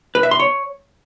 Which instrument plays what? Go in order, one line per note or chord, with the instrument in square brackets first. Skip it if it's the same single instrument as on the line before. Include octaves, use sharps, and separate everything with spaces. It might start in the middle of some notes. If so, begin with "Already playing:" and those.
[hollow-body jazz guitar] B4
E5
C6
C#5